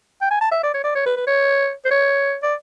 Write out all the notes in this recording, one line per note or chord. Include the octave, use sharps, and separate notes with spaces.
G5
G#5
A5
E5
D5
C#5
D5
C#5
B4
B4
C#5
C5
C#5
D5